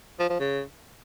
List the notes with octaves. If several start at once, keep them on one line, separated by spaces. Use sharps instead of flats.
F3
F3
C#3